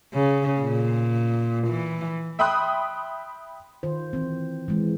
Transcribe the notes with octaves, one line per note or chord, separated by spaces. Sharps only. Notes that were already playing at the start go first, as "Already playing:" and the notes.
C#3
A#2
E3
E5 G5 B5 C6 D#6 F#6
D#3 F4 C5
E3 C4
E3 G#3